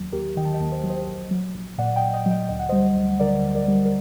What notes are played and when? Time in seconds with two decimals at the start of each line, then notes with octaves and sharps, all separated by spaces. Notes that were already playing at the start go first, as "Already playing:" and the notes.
Already playing: D#2 F#3
0.12 D#2 G4 A#4
0.36 D#3 D#5 G5
0.45 A5
0.54 D#5 G5
0.60 D#2
0.72 C5 D#5
0.83 F#3
0.90 C5 D#5
1.07 A#1
1.31 F#3
1.55 A#1
1.78 A#2 D5 F#5
1.96 D#5 G5
2.02 A#1
2.14 D#5 G5
2.26 F#3
2.31 D#5 G5
2.49 D2 D#5
2.59 F#5
2.69 G3 C5 D#5
2.96 D2
3.20 D3 A#4 D5
3.44 D2
3.55 A#4 D5
3.68 G3
3.85 A#4